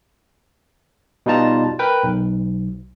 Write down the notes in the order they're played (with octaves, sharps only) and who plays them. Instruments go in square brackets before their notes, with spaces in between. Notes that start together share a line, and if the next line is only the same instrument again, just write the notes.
[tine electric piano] B2 G3 D#4 F4 A5 A#5
A#4 B4 G5
B1